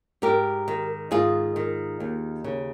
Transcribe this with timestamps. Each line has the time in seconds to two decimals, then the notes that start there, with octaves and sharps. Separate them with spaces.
0.22 G#2 G4 A#4
0.68 D#3
1.11 G#2 F4 G#4
1.56 D#3
2.00 D#2
2.44 C#3